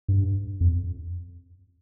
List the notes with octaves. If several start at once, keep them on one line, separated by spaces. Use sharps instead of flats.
G2
F2